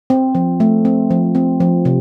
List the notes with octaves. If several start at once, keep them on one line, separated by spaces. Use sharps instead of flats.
C4
F3
A3
C4
F3
C4
F3
C3